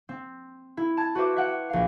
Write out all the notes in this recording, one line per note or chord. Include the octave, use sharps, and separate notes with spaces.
C4
E4
A5 G#6
F#4 B4 C5 E5 D6
E5 F#5 G5
A#1 F5